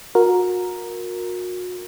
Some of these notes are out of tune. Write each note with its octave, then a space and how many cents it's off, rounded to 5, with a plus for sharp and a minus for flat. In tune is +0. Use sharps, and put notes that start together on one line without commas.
F#4 -35 A#4 +0